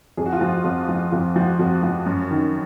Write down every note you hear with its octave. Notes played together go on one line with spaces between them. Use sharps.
F2 G#4
F#4
F4
F3 F#4
F2
F3
F2 F4
F3 F#4
F2 F#4
F3
F#2
D#3